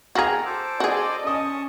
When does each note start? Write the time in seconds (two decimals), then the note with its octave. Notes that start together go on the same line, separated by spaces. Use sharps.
0.15 F#4 G#4 A4 F5 G5 A#5
0.45 A4 C5 D6
0.80 F#4 G#4 D5 D#5
1.27 C#4 D#5 A5 C#6 D#6